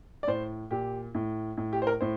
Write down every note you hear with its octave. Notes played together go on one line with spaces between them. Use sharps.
D5
A2 C5
A#2 G4
A2
A2
G4
C5
A#4
A2 C5